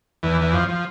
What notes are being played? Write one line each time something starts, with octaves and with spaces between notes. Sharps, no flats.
E2 E3
E3
F2 F3
F3